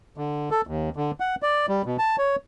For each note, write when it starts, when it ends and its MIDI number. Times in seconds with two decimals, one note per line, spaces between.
0.18 0.49 50
0.51 0.61 69
0.67 0.90 39
0.96 1.11 50
1.20 1.35 78
1.43 1.66 74
1.68 1.82 55
1.86 1.97 47
1.99 2.16 81
2.18 2.36 73